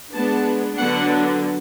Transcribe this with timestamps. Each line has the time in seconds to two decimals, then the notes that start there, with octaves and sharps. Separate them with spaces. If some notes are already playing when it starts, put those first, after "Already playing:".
0.14 G#3 B3 D4 A5
0.77 D3 F#3 B3 D4 F#5